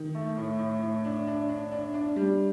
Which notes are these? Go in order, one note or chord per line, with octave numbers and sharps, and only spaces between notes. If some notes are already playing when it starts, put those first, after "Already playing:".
Already playing: D#3
A3
A2
A2
A2
D4
D4
D4
D4
D4
G3